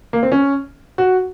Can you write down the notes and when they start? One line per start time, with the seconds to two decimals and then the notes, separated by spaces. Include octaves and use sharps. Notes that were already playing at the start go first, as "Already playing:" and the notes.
0.13 A#3
0.23 C4
0.32 C#4
0.98 F#4